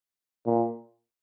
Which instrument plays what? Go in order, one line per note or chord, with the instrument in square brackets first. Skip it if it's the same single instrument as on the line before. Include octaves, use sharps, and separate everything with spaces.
[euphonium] A#2